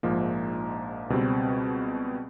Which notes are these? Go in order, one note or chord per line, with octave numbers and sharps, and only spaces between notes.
A#1 G#2 F3 A#3 D#4
C#2 B2 G3 C4